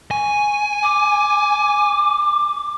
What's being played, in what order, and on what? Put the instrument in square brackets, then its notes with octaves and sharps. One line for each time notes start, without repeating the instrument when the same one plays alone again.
[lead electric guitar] G#5 [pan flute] C#6
[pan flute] D6